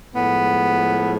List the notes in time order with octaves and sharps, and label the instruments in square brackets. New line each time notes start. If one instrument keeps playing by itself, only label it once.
[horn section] A2 F3 G#3 B3